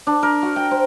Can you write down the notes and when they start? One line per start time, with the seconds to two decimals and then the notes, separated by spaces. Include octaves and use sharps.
0.07 D4
0.23 A#4
0.43 F#4
0.56 G5
0.71 C5